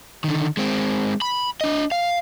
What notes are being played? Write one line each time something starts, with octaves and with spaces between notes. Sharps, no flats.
D3 D#3
G#3 C4
B5
D4 D#5
F5